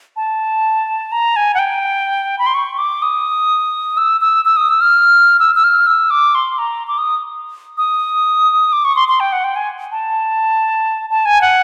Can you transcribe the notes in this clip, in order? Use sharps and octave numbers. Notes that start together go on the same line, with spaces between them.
A5
A#5
G#5
F#5
G5
B5
C6
C#6
D6
D#6
E6
E6
E6
D#6
E6
F6
E6
E6
F6
E6
D6
C6
A#5
D6
D#6
D#6
D6
C#6
C6
C6
G5
F#5
G5
G#5
A5
A5
G#5
F#5